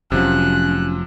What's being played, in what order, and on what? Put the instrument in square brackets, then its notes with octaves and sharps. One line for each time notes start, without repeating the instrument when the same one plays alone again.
[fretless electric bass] F1 F#3 [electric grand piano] C3 F3 [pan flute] C#4 [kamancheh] F#6